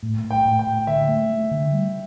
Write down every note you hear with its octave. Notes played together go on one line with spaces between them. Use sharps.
A2
A2
G5
A2
G5
A2
D3 E5
A3
A3
D3
G3